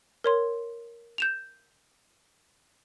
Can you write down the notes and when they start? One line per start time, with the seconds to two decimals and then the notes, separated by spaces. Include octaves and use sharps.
0.24 A#4 C#5 C6
1.18 G6 E7 F7